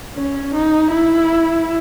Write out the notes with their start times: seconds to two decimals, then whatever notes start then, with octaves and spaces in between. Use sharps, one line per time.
0.15 C#4
0.54 D#4
0.92 E4